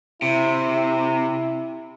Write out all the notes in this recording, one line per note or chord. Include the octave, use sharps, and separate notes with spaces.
C3 E4